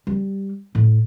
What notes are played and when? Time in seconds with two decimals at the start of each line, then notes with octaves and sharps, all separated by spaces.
0.07 G3
0.75 A2